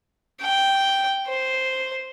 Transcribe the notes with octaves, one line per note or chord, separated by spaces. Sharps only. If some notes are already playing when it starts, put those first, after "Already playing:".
G5
C5